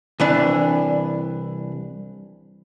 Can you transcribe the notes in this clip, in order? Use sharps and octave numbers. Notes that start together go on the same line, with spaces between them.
C2 E3 D4